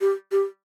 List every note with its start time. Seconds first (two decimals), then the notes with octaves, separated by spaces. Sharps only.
0.01 G4
0.31 G4